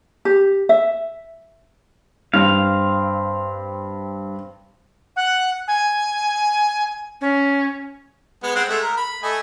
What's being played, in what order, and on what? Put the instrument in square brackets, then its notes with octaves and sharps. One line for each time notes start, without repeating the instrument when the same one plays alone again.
[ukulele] G4
E5
[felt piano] G2 [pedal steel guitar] C4 F5
[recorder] F#5
G#5
C#4
[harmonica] G#3 B3
G#3 C4 F#5
G#3 A3
A#4
B5
A3 D#5 G#5